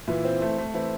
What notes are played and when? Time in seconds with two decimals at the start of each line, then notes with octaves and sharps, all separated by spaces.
0.07 A#2 E3 E4
0.25 C4
0.42 A3
0.58 A3
0.74 E3 C4 E4